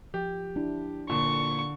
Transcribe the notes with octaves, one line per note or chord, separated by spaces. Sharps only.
F3 G4
D4 E4
A#2 D3 C#6